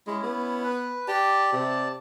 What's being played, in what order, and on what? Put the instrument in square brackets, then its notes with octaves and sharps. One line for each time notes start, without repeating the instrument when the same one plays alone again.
[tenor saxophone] G#3 [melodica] C#4 E4
[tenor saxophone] B3
[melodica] B4
[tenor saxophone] G4 [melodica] D5 A5
[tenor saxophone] C3